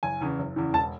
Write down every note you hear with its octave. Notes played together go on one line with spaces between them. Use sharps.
F#1 G#5
E2 C#3 E3
F#1
E2 C#3 E3
E1 A5